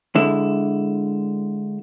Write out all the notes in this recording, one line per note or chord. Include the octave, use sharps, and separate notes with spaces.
D3 G#3 E4